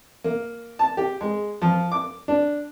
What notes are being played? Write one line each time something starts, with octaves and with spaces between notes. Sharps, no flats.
A#3
A5
G4
G#3
F3
D6
D4